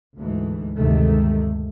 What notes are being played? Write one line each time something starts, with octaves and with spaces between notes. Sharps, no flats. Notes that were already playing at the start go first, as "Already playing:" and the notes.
D2 G#2 E3
D2 G2 C3 D#3 G#3 A3